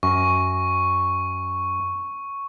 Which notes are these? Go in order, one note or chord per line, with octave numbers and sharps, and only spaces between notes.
F#2 C#6